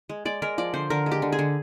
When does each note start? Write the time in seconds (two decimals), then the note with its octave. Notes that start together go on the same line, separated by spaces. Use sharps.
0.09 G#3
0.25 G#3 D5
0.42 G#3 A#4
0.58 F3 D5
0.74 D3 C5
0.90 D3 A#4
1.06 G#3
1.12 G4
1.22 D3
1.32 G#4
1.39 D3